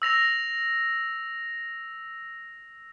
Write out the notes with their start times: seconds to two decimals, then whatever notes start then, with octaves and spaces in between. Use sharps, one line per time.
0.02 E6 A#6 F7